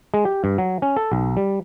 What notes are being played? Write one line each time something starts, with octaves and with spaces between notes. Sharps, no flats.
G#3
G4
G2
F#3
C#4
A4
B1
G3